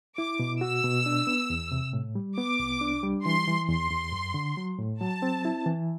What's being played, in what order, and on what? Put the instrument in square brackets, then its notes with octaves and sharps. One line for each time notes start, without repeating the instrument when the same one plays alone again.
[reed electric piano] E4 [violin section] D6
[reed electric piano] B2
[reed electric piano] F#4 [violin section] E6
[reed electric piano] B2
D4
B3
E2
C3
A2
G3
[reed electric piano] B3 [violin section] D6
[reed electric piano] C2
D4
G3
[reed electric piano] E3 [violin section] C6
[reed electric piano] E3
[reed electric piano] E2 [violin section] C6
[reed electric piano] E2
F#2
D3
F#3
A2
[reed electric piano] F#3 [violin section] A5
[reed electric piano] C4
E4
E3